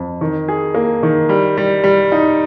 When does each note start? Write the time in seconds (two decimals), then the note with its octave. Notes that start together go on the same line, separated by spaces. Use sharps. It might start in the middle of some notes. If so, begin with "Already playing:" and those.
Already playing: F2
0.21 D#3
0.48 G#4
0.74 A#3
1.03 D#3
1.29 G3
1.57 G3
1.84 G3
2.12 D#4